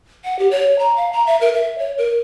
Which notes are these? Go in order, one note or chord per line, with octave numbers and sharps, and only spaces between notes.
F#5
G4
C#5
A#5
F5
A#5
E5
A#4
E5
C#5
A#4